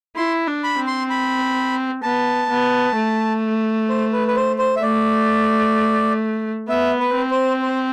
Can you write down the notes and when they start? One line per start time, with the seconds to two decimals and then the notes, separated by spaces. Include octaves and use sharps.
0.16 E4 C6
0.47 D4
0.64 B5
0.79 C4
0.87 C6
1.10 B5
2.03 B3 A5
2.50 B3
2.96 A3
3.89 C5
4.12 B4
4.28 B4
4.36 C5
4.59 C5
4.76 E5
4.82 A3 D5
6.69 B3 E5
7.00 B4
7.15 C4
7.31 C5
7.62 C5